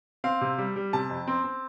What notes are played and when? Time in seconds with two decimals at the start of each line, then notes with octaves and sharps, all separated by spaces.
0.24 C4 F5
0.41 C3
0.58 G3
0.76 G3
0.93 C3 A5
1.09 F2
1.27 C4
1.44 C4